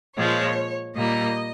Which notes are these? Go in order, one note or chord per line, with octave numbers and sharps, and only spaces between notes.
A#2 F3 G#3 C#5
A#2 G3 A#3 D#5